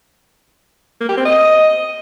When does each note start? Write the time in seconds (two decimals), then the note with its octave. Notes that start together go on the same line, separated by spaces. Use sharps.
1.01 A#3
1.09 G4
1.17 C4
1.26 D#5